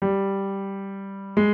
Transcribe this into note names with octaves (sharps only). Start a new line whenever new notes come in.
G3
G#3